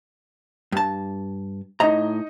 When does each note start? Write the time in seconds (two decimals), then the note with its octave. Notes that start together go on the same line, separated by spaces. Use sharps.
0.72 G2 A5
1.80 A2 D#4 D#5 A#5